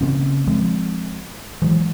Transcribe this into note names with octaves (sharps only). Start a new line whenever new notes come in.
C#3 A#3 C4 C#4
F3 G#3 C4
E3 F#3 G#3